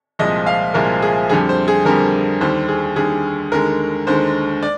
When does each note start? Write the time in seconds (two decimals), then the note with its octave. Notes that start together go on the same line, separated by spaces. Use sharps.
0.19 C2 A#2 F3 G#3 D#5
0.46 F5
0.74 C2 A#2 F3 G#3 A#4
1.02 G#4
1.30 F2 D3 G3 G#4
1.49 C5
1.68 G#4
1.85 F2 D3 G3 A#4
2.41 D#2 D3 G3 C5
2.68 G#4
2.96 D#2 D3 G3 G#4
3.52 D#2 D3 G#3 A#4
4.07 D#2 D3 G#3 C5
4.63 D5